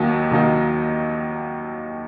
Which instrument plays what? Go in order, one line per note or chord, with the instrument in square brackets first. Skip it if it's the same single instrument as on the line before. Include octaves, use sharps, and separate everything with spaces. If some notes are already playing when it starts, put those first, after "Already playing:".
Already playing: [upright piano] D#2 D#3 F#3 A#3 D#4
D#2 D#3 F#3 A#3 D#4